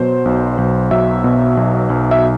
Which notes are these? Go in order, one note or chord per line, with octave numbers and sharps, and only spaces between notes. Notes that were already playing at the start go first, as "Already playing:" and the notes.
Already playing: B2 F#3 C5
B1
B1
F#3 E5
B2
B1
B1
E5